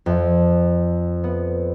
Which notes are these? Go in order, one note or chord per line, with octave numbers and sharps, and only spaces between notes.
F2
B3